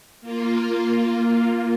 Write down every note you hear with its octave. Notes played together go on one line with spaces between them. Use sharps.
A#3 F4